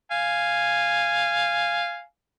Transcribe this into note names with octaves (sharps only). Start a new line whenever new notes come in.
F5 G#5